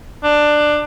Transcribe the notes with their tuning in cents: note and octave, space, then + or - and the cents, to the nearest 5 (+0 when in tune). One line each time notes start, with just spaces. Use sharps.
D4 +15